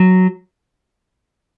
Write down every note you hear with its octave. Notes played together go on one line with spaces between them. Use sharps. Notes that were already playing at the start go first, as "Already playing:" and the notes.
Already playing: F#3